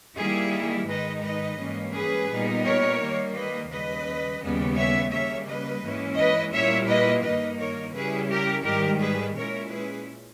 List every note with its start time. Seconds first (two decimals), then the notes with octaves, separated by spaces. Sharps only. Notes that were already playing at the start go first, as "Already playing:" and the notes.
0.17 D#3 G3 A#3 E4 G#4
0.87 G#2 D#3 G#3 D#4 B4 D#5
1.23 B4 D#5
1.59 G#2 E3 G3 A#3 C#4
1.93 G#4 B4
2.30 A#2 G3 B3 D#4
2.64 A#4 C#5
3.00 D#3 G3 A#3
3.35 B4 D#5
3.70 D#2 C#3 G3 B4 D#5
4.41 D#2 C#3 G3 B3
4.77 C#5 E5
5.11 C#3 G3 A#3 C#5 E5
5.47 B4 D#5
5.83 G#2 E3 A#3 C#4 E4
6.18 B4 D#5
6.53 A#2 G3 A#3 E4 C#5 E5
6.89 B4 D#5
7.24 G2 D#3 A#3 D#4 B4 D#5
7.60 A#4 C#5
7.94 C#3 G3 C#4 E4 G#4 B4
8.30 G4 A#4
8.65 G#2 D#3 G3 G4 A#4
9.01 G#4 B4
9.36 A#2 G#3 C#4 E4 A#4 C#5
9.71 G#4 B4